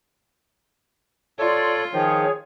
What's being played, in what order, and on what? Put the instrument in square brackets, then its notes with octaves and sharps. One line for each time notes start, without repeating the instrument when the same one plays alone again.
[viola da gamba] F4 [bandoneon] A4 C#5 [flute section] D5 C6
[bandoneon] D#3 F3 [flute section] G#4 C#5